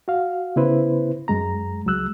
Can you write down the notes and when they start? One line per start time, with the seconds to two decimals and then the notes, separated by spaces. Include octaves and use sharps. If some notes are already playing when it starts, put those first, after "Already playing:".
0.08 F#4 F5
0.56 C#3 B3 E4 B4 C5
1.28 F#2 G#3 A#5
1.86 C#2 F#3 G#3 E6 F#6